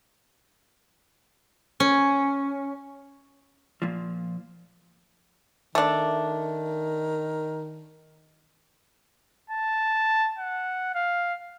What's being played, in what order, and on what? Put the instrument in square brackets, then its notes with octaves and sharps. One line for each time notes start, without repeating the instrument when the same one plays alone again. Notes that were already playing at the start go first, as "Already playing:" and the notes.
[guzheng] C#4
[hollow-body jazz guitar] A#2 F3
[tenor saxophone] D#3 [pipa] A3 D4
[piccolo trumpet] A5
F#5
F5